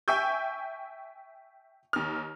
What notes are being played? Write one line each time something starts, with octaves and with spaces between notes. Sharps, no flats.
E5 G5 G#5 C#6 E6 G6
D#2 F6